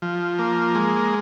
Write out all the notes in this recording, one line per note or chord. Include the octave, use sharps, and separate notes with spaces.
F3
A#3
G#3